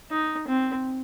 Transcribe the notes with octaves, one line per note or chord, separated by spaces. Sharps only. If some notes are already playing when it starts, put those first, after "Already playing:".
D#4
C4